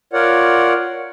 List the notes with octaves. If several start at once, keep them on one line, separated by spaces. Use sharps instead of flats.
F4 A#4 C#5 D5 F#5